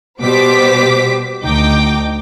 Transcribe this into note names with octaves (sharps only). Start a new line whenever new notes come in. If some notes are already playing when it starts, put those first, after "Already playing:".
B2 G3 G4 C5 D6 B6
D2 D#4 G5 D6